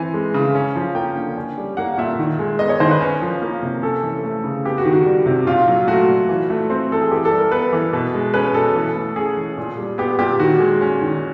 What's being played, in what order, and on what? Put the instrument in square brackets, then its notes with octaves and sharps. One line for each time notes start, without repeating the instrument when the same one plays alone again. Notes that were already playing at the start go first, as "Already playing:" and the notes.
Already playing: [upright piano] E3 C4 G#5
G#3
C#3
C#4
F3
A#3 G5
D3
C#4
G3
A#3 F#5
A#2 E5
D#3
G#3
B3 D#5
C#5
D#3 C5
B4
C#4
F3
A#3
C3
C#4 A4
E3
A3
C#3
B3 G4
F#4
D#3
F#4
G3
C3
A#2 F4
F#3
A3 F#4
A#2
E3
A3
C4
E3 A4
G#4
E3 G4
A4
G3
A#4
B3 B4
E3
B2
G#3
C#4 B4
B2 A4
E3
A3
C#4 G#4
E3
A#2
G3
B3 G4
A#2 G4
D#3 F#4
G#3
C#4
D#3